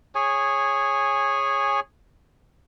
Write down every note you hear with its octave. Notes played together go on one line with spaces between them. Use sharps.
G#4 C#5 G#5